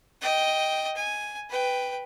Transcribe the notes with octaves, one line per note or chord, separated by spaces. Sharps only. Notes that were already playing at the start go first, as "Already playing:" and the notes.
D#5 G5
G#5
B4 G5